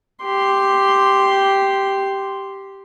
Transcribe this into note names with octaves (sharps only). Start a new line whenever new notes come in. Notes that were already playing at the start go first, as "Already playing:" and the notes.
G4 C6